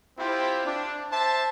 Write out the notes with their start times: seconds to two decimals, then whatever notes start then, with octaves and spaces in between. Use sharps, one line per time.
0.18 C4 E4 F4 G4 C5
0.66 D4
1.11 C5 E5 A5